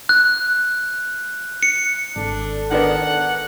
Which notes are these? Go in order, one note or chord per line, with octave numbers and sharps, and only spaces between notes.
F#6
C#7
G#1 D4 A4
D#3 B3 D4 F#5